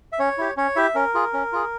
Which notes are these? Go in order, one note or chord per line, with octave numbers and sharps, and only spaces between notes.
E5
C#4 C#5
E4 G4
C#4 C#5
E4 G4 E5
C#4 A#4
F4 G#4
C#4
F4 G#4